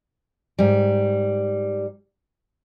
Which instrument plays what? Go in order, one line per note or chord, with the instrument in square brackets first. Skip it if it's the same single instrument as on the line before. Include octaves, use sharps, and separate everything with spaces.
[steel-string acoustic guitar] G#2 G3